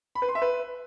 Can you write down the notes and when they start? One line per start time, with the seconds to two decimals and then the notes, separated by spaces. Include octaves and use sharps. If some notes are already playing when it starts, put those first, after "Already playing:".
0.15 B5
0.22 B4
0.29 C6
0.35 E5
0.42 B4